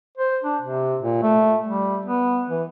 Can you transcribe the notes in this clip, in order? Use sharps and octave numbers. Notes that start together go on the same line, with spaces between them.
C5
D4
C3
A#2
A3
G3
B3
E3